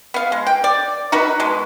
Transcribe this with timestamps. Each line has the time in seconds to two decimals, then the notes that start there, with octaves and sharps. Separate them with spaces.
0.14 B3 F5
0.32 G#3
0.47 G5
0.64 D5
1.12 D#4 F#4 A#4 B4
1.40 B2 G#3